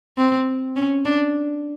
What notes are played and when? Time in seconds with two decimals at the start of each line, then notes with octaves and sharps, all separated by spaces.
0.17 C4
0.76 C#4
1.05 D4